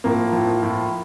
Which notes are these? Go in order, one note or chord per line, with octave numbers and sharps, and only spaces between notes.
A2 F3 A#3
A2 F3
A2 F3